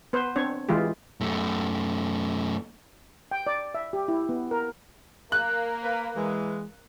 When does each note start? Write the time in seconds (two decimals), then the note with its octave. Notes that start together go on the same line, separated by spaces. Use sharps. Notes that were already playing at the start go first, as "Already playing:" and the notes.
0.13 B3 B4 C5
0.36 C4 D4 C#5
0.69 E3 G#3 F4 G4
1.21 F#2 A3
3.31 G5
3.47 D5
3.75 E5
3.93 G4
4.08 E4
4.29 B3
4.51 A#4
5.32 A#3 F#6
5.83 A#4 B4
6.16 E3 G#3